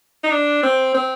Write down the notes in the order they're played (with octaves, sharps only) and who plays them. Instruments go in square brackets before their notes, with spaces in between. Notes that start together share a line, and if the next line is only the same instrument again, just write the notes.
[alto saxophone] D#4
D4
C4
C4